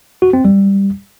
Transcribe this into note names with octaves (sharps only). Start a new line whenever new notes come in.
F#4
C4
G3